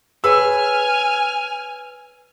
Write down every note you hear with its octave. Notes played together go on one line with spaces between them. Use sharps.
G#4 B4 C#5 G#5 E6 F6